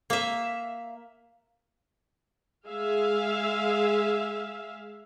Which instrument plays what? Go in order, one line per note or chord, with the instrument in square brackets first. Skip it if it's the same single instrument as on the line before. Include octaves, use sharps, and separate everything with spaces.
[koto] A#3 E5
[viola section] G#3 G#4 E5 F5